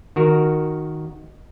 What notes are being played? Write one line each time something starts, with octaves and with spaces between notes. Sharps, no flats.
D#3 F#4 A#4